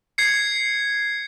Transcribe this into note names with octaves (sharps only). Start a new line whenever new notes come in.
G#6 C7 C#7